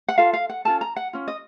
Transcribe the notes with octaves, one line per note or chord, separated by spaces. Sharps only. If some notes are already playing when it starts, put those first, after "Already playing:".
F#5
F4 A4 F5
F5
F#5
C#4 F4 A4 A5
A#5
F#5
C#4 F4
D#5